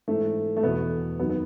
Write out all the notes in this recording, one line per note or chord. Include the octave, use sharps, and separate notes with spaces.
G#2 E3 A3
A3
E2 B2 B3
F#2 D#3 B3
B3